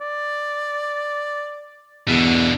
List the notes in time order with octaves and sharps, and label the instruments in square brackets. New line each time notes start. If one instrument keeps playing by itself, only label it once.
[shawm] D5
[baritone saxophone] E2 [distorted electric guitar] B2 D3